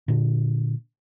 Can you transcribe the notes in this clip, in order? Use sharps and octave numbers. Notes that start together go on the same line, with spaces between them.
A#2 D3